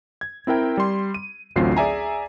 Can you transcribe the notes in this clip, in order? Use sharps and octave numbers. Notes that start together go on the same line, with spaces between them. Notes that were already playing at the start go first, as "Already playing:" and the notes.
G#6
C4 E4 A#4 G5
G3 C6
D#7
A1 D2 F#3 C4 F4 C7
G#4 D5 E5 G#5 A#5